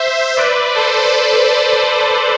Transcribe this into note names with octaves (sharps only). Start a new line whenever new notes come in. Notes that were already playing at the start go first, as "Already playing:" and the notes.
Already playing: C5 E5
B4 D5
A4 C5